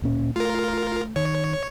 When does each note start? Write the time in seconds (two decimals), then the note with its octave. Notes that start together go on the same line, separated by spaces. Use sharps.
0.02 D1 A#2 C#4
0.36 A3 F4 A#4
1.16 D#3 C#5